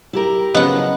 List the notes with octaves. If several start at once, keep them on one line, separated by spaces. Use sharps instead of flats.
E4 G4 A#4
C#3 F3 F#3 B3 D#5 F#5 C6